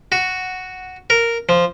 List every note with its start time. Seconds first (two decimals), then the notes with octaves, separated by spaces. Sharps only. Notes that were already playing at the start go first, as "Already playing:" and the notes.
0.12 F#4
1.10 A#4
1.49 F3